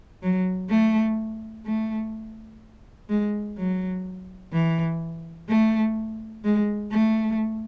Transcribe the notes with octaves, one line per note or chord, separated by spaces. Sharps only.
F#3
A3
A3
G#3
F#3
E3
A3
G#3
A3